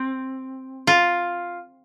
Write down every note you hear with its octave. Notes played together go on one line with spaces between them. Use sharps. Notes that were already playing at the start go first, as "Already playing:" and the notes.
Already playing: C4
F4